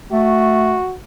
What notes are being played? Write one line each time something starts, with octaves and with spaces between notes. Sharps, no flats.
A3 F#4